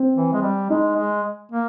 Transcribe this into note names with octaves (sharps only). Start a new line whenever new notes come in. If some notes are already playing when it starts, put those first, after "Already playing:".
Already playing: C4
E3
G#3
G3
G#3 D#4
G#3
A#3